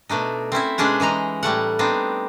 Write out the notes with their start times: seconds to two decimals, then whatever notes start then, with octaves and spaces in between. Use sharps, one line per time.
0.09 B2 A3 D4 D#4
0.52 C4 C#4 E4 E5
0.78 B2 G#3 C#4 D4 G#4 F#5
1.00 E3 G#3 D#4 A#5
1.43 A2 G3 A3 F#5
1.79 B3 C4 D4 D#4